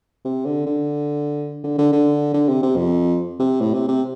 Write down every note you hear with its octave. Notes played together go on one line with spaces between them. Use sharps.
C3
D3
D3
D3
D3
D3
D3
C3
C3
F2
C3
A2
C3
C3